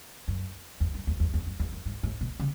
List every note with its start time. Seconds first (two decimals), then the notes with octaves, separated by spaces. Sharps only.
0.28 F#2
0.80 E2
0.94 F#2
1.07 E2
1.20 E2
1.34 E2
1.46 F#2
1.60 E2
1.72 F#2
1.86 G#2
2.03 A2
2.21 B2
2.40 C#3